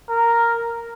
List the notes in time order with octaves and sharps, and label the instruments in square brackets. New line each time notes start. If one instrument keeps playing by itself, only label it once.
[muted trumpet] A#4